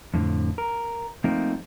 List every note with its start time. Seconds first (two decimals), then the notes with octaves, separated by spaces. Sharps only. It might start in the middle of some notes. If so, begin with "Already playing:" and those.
0.14 F2 A2 D3
0.58 A#4
1.24 F3 A3 A#3 C4 D#4